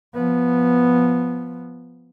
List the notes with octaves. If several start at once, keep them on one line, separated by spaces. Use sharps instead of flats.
F3 B3